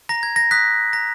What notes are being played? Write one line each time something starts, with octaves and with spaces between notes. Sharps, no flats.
A#5 A#6
G#6
A#6
D#6 F#6 B6
A#5 A#6